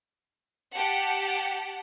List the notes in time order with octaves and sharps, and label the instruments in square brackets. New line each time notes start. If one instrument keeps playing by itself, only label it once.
[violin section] G4 F#5 A5